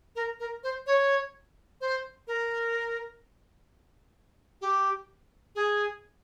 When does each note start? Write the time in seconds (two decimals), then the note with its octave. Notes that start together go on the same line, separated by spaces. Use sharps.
0.16 A#4
0.40 A#4
0.64 C5
0.87 C#5
1.81 C5
2.27 A#4
4.61 G4
5.55 G#4